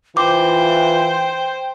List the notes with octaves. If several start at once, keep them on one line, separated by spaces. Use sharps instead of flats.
E3 F4 C5 G5 D6